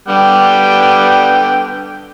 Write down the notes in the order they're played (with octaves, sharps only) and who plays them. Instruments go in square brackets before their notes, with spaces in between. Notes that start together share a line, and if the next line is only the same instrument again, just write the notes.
[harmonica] D3 B3 G5 [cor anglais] G3